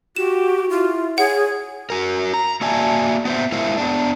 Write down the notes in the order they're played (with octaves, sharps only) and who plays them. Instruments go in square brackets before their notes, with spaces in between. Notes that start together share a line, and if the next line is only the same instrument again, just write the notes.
[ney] F#4 [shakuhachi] G4 [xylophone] E7
[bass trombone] E4 [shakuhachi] F4
[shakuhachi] G#4 [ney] C#5 [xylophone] F#5
[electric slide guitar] F#4 A#4
A#5
A#3 F#4 D5 E5 G#5 A5
B3 C5 E5
G#3 E4 A#4 C5 E5 F5
B3 D4